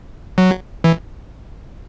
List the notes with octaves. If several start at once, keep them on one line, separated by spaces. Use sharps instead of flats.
F#3
E3